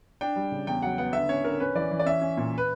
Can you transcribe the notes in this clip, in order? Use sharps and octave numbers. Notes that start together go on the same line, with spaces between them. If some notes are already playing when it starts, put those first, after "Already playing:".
D4 G5
G3
C#3
E2 G5
F#3 F#5
B3 F#5
D3 E5
C#4 C#5
D3 A#4
C#4 B4
E3 D5
E3
D5
C#4 E5
C#4
A#2
B4